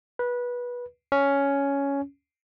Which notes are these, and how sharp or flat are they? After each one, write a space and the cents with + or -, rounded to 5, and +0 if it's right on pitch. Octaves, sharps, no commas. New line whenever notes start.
B4 -20
C#4 +10